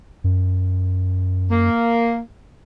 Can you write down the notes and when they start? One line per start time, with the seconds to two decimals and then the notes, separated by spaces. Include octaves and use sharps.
0.24 F#2
1.51 A#3